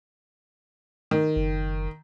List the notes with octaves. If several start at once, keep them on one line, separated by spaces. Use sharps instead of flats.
D#3
F#1